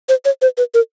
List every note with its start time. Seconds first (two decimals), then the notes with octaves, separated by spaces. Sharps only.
0.09 C5
0.25 C#5
0.42 C5
0.57 B4
0.74 A#4